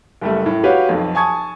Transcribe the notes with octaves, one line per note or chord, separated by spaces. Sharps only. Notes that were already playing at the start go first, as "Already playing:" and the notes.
F#1 G3 A3
A2
F#4 G4 B4 C#5 F5
B1 F2
G#5 A5 C#6 D#6 G#6